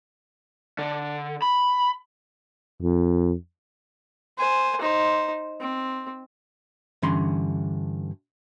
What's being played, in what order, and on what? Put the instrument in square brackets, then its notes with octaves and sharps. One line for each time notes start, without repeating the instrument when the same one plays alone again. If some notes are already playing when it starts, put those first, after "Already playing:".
[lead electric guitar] D3
B5
[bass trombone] F2
[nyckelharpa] C5 G#5
D#4 C5
C4
[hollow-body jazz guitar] G2 D3 E3 C#4 B5 C6